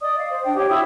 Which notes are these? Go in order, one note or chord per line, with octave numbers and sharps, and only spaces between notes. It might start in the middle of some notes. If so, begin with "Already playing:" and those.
D5 D#5 D#6
F5
C5
D4 G5
G4 C#5
E4 F#4 D#6 E6